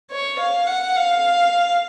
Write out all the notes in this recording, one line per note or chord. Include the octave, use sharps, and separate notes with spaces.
C#5
F5
F#5
F5